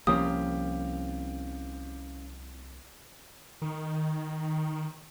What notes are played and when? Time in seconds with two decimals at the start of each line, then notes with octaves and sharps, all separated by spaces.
0.07 C2 F3 A#3 C4 C#4 G4 F5 D#6
3.62 D#3